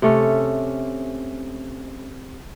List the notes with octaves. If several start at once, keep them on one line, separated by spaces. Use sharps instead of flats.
C3 A3 C#4